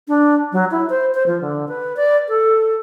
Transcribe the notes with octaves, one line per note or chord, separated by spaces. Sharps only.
D4
F#3
E4
C5
C5
F3
D3
B4
D5
A4